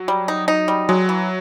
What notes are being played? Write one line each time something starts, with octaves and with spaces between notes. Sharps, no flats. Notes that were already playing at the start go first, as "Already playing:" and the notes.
Already playing: F#3
G3
D#4
D#4
G3
F#3 G#3
E3